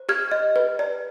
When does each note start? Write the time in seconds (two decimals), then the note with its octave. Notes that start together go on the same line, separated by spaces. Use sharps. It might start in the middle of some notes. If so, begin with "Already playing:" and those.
Already playing: C5
0.09 G4 F6 G#6
0.32 D#5
0.56 B4
0.79 D5